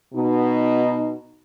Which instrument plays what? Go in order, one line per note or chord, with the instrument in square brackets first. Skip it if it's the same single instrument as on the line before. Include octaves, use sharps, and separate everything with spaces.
[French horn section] B2 D#4